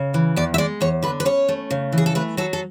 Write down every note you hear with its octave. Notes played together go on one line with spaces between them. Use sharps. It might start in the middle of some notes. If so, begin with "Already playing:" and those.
Already playing: C#3
E3
E2 D5
E5
G#3 D5
E2 C#5
D3 B4
B4
C#4 C#5
A3
C#3
E3
G#4
A4
A3 B4
F#3 A4
A4